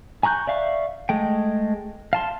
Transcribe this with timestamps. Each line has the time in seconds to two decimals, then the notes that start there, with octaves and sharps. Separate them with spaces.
0.23 G#5 A#5 C#6 F#6 G6
0.47 D5 E5 F5 C#6
1.09 G#3 A3 G5
2.13 F5 A5 C6